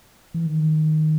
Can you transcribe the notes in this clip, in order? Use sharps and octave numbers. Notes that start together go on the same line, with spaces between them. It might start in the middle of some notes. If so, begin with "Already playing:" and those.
E3
D#3